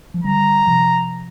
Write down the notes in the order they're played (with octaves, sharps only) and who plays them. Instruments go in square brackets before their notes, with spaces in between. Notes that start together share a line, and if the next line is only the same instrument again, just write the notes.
[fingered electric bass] F3
[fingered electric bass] D3 G3 [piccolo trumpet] A#5
[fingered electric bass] C3 F3